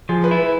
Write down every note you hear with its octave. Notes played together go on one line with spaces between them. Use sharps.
F3 G#4
B4
E4